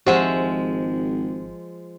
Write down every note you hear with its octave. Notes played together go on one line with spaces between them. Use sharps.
G#1 F3 G#3 G4 C5 E5 F#5